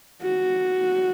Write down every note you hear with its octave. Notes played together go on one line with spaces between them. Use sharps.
F#4